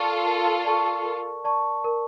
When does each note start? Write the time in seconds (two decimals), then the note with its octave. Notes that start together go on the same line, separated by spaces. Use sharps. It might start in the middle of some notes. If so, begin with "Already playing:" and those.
Already playing: F4 A4 A#4 D5 A5 C#6
0.25 A#4
0.65 D5 A5 C#6
1.05 A#4
1.44 D5 A5 C#6
1.84 A#4